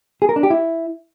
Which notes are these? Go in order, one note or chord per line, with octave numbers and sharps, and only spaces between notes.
G#4
A#4
D4
G4
E4